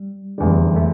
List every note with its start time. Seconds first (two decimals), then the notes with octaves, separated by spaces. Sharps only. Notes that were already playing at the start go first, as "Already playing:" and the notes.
Already playing: G3
0.38 F1 E2 D3 G3
0.76 A3